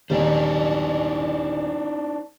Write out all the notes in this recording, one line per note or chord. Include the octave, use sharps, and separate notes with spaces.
D#1 D4 D#4 C5